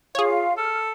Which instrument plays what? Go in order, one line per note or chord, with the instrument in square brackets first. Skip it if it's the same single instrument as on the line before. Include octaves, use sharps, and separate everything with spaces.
[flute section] F4 F5 [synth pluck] G#4 C#5
[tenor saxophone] A4 [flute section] F6